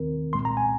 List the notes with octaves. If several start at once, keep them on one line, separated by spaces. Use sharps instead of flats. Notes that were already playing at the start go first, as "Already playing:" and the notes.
Already playing: D#2 D#3 C4 A#4
C2 A#2 G#3 C4 C6
A#5
G#5